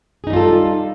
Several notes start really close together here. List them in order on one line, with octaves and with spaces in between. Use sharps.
G#4 D#4 G3 F4 A4